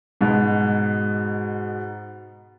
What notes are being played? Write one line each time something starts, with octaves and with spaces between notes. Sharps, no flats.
G#2 B2